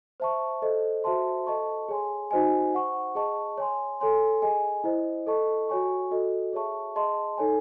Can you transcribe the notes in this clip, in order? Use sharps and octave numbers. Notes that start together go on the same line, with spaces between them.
C5 E5 A5 C#6
A4 C5 D#5
F#4 C5 E5 A5 C6
A4 D#5 A5 C#6
G#4 C#5 G#5 C6
D#4 F#4 C5 D#5 G#5
C5 F#5 C#6
G#4 D#5 A5 C#6
C#5 G#5 C6
A4 C#5 G#5 C6
G#4 D#5 G#5
E4 C5 D#5
A4 D#5 A5 C#6
F#4 C#5 G#5 C#6
F#4 A4 D#5
G#4 C#5 E5 A5 C#6
G#4 D#5 A5 C6
D#4 A4 C#5 G#5